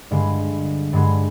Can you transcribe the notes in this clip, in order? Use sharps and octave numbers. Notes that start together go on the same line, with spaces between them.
G2 D3 G#3
G2 D3 G#3